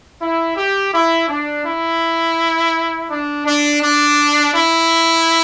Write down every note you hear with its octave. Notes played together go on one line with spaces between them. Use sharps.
E4
G4
E4
D4
E4
D4
D4
D4
E4